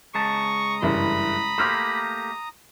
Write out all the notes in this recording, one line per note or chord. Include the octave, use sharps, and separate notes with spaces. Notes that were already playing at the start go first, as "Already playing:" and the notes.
C#3 G#3 A5 A#5 C#6 D#6
F#1 G2 E3 B5
A3 A#3 G4 C6 E6 F6